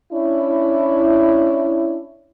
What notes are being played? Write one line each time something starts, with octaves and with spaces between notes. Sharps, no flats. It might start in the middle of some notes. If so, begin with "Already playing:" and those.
C#4 D4 E4